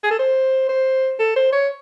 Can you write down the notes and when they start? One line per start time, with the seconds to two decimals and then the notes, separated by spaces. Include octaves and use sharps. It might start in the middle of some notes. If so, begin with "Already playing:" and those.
0.04 G#4
0.11 A4
0.19 C5
0.69 C5
1.19 A4
1.36 C5
1.52 C#5